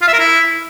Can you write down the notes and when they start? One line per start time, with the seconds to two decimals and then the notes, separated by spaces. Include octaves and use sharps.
0.02 F4
0.08 E5
0.13 A#4
0.19 E4